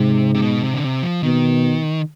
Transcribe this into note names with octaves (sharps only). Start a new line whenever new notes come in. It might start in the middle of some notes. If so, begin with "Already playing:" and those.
Already playing: G#2 C3
C3
B2
C3
D3
C3
F3
B2 D#3